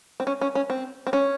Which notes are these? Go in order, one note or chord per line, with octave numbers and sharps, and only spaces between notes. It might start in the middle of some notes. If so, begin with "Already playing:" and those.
C4
C#4
C#4
C#4
C4
C4
C#4